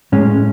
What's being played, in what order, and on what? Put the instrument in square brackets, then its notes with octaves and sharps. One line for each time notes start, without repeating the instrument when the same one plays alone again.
[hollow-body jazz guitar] A2 G#3 C#4